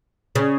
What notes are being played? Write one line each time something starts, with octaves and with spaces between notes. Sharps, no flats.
C#3 C#4